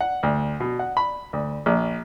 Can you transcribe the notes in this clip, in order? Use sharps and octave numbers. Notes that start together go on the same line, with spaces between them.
F#5
D2
B2
F#5
B5
D2
A#1